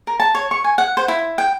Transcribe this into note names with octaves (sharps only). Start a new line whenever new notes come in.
A#4
A5
C#5
C#6
G#5
F#5
C5
E4
G5